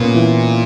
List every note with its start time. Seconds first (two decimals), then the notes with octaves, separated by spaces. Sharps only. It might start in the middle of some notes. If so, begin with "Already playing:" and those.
Already playing: A#2 A#3 B3 C#4
0.14 E3